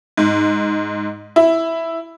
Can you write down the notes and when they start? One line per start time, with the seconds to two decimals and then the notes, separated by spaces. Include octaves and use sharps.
0.17 G#2
1.36 E4